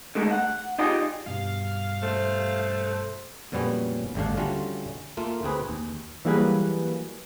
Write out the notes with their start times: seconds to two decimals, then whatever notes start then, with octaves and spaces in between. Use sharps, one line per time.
0.15 D3 D#3 G#3 A3 D#4
0.31 F#5
0.79 D#4 F4 G4 G#4 D5 D#5
1.26 G2 B2 G3 F5
2.03 A3 C5
3.52 F2 A#2 F#3 G3 B3 C#4
4.15 G#1 D#2 D3 D4 F5
4.37 D3 G3 A3 C#4 F4 F#4
5.17 A3 A#3 F4
5.43 D2 C4 G#4 B4
5.69 D#2
6.25 E3 F#3 G3 A#3 G#4 B4